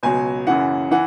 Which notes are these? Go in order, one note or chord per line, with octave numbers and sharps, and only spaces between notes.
C#2 B2 F#3 G#5
F#2 C#3 E3 F#5
E3 F#5